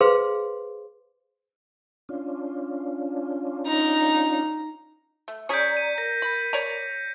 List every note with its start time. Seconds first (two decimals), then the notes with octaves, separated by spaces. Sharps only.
0.01 G#4 B4 C5 F5 C6
2.09 C#4 D4 F4
3.66 D#4 A#5
5.28 A3
5.49 C#4 G#4 D5 A#5 G6 B6 C#7
5.77 D#7
5.98 A#4 A#6
6.22 B5
6.53 C#5 D5 A#5